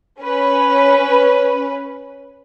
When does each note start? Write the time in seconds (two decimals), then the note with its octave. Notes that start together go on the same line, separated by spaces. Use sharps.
0.20 C#4 B4